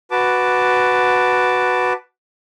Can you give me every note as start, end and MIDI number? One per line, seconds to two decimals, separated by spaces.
0.11 1.93 66
0.11 1.93 71
0.11 1.93 81
0.11 1.93 86